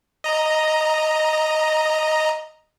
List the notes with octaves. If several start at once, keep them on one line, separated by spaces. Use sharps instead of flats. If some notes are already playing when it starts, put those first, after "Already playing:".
D#5 A#5